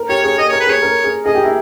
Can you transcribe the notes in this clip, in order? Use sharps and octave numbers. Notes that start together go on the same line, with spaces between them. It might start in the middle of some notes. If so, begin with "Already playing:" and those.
Already playing: A#4
G4 C#5
G#4 C#5
G#4 D#5
C#5
A#4
B4
G#4 C#5
A#4
G#4
G#4 D#5
G4
E4